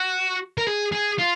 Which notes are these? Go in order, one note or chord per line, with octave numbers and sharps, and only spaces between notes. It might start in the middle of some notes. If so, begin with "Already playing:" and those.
Already playing: F#4
A#4
G#4
G#4
F4